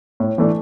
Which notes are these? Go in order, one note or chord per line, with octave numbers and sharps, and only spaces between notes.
A2
E3 A3 D4